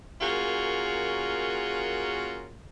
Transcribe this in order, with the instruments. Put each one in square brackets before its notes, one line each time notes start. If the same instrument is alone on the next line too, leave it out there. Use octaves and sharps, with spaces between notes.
[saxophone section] A#3 C#4 F4 F#4 G#4 A#4